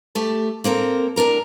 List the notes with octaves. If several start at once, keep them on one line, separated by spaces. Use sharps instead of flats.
A3 G4 A4
A#3 C4 A4 A#4
A2 D4 A#4 A#5